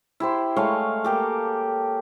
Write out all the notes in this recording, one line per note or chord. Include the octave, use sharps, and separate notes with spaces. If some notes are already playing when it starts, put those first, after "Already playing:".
E4 G4 C5
G#3 A3 C#5 F5
A#3 G4 A4